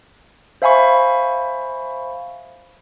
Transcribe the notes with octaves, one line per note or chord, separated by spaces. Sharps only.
C5 E5 F5 G#5 B5 C#6